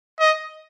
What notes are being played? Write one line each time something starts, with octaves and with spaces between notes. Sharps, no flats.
D#5